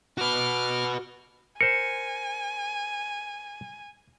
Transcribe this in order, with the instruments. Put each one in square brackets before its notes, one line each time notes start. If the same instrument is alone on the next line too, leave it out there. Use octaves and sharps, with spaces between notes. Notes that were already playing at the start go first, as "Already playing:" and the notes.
[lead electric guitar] F#4 B4 [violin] D6 F6
[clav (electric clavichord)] A#4 C5 [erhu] G#5 [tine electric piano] C#7